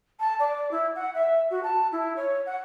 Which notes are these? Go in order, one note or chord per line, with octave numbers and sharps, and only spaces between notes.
A5
D5
E4
F#5
E5
F#4
A5
E4
C#5
F#5